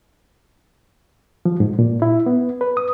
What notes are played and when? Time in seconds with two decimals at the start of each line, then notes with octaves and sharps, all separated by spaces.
1.45 F3
1.60 G#2
1.79 A#2
2.02 E4
2.26 B3
2.61 B4
2.77 D#6